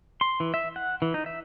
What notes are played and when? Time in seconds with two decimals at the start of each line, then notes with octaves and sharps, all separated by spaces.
0.21 C6
0.40 E3
0.54 E5
0.76 F#5
1.02 E3
1.14 D#4
1.26 E5